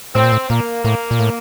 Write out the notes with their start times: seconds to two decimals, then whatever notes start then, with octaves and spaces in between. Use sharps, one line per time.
0.15 A2 C4
0.23 A#2
0.32 A2
0.49 A#2 A#3
0.84 A2 A#3
1.11 A#2
1.19 A2